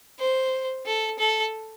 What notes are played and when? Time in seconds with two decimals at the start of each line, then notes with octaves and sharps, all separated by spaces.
0.19 C5
0.86 A4
1.19 A4